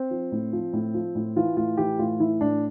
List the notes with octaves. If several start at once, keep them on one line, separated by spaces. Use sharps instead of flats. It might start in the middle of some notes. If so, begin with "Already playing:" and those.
Already playing: C4
F3
A2
F3
A2
F3
A2
E3 F4
A2 F4
E3 G4
A2 F4
E3 E4
A2 D4